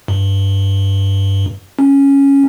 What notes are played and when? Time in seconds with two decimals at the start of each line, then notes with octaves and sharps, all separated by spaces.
0.08 G2
1.79 C#4